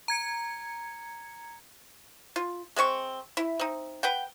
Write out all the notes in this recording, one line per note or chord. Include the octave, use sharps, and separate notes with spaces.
A#5 G#6 C#7
F4
G#3 C4 D5 C#6
E4
C4 D#4
B4 F#5 G5